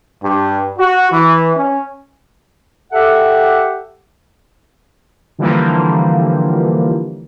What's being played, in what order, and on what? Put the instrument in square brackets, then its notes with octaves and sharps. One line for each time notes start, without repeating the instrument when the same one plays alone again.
[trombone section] G2
F#4
E3
C#4
[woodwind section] G4 A4 E5 F#5
[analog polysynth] D3 E3 F3 G3 A#3